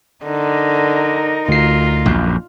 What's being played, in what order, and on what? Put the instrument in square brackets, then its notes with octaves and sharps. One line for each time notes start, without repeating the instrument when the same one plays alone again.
[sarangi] D3 [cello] D#4 A#4
[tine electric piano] D2 C7 [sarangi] F4
[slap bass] A#1 F#2